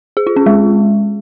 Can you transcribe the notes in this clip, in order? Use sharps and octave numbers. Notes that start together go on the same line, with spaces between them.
G#4
F4
C#4
G#3